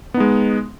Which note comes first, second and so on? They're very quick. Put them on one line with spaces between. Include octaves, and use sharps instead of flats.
B3 D#4 G#3